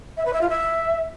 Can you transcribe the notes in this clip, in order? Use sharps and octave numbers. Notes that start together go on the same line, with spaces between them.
E5
B4
E5
F4
E5